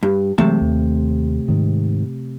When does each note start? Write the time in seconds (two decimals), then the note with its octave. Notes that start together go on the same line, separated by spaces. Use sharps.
0.03 G2
0.38 C3 E3 F#3 G#3 A3 A5
0.61 D#2
1.48 G#2 D#3